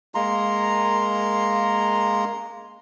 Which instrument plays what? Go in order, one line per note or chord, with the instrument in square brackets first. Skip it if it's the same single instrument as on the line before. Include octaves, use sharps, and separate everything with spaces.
[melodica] G#3 A#3 A#5 C6